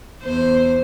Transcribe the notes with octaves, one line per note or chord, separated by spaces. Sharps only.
E2 C5